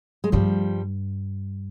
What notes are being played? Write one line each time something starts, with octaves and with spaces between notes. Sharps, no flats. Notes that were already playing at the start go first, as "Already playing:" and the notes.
G#3
G2 F3 G3